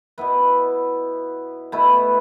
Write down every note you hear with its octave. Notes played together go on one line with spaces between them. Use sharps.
B2 B3 E4 B4
B2 A3 E4 B4